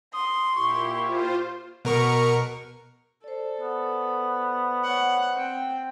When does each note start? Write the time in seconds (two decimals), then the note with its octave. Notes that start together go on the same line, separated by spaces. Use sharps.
0.13 C6 D#6
0.56 A#2 E4 G4 C#6
1.01 F4 C5
1.85 B2 A#4 C#6
3.24 A4 C5 D5
3.61 B3
4.81 C#5 F#5
5.33 C4 G5